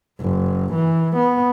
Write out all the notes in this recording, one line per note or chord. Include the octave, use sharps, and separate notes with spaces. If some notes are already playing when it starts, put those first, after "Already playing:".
F#1
E3
B3